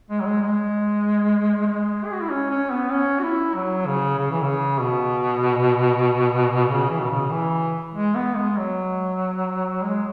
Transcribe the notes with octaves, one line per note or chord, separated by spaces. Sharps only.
G#3
F#3
G#3
G#3
G#3
G#4
F#4
E4
C#4
C#4
B3
C#4
F#4
E4
F#3
C#3
C#3
E3
C#3
B2
C#3
E3
B2
C#3
E3
G#3
B3
G#3
F#3
G#3